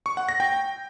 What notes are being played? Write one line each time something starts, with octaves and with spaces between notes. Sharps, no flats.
C#6
F#5
A#6
G5